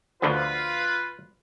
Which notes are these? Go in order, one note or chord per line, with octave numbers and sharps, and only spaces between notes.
D2 D3 F3 F4 B4